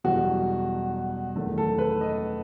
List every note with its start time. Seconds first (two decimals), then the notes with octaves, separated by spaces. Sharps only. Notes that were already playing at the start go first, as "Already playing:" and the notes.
0.04 F#1 E2 B2 G3 F#4
1.35 F#1 E2 D#3 A3
1.58 A4
1.78 B4
2.01 D#5